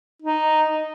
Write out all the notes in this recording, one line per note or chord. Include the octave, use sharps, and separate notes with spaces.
D#4